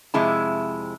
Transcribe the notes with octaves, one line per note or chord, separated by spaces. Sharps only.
F2 C3 G#3 E4 A5